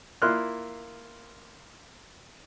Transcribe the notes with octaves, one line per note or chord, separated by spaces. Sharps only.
A#3 E4 F4 C6 F6 F#6